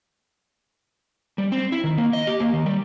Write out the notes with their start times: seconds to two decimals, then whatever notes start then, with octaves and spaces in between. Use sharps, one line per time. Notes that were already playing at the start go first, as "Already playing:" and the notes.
1.38 G3
1.52 C4
1.72 E4
1.84 D#3
1.97 A#3
2.13 D#5
2.27 G4
2.40 A#3
2.53 D#3
2.66 G3